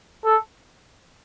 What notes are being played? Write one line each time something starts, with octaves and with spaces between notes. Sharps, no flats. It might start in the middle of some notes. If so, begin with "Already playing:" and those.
A4